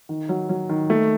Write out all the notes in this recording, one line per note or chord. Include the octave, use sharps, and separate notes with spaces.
D#3
F#3
F#3
D#3
A3